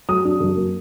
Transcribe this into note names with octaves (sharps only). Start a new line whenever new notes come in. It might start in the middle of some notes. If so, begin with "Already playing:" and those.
F#3 D#6
D4
F#2
A#3